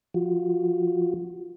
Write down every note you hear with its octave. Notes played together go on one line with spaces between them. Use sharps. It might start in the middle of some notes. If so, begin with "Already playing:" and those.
F3 F4 F#4